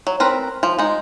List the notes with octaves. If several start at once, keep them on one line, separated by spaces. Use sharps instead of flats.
F#3
C4 A#4 B4
F3
G#3 D#4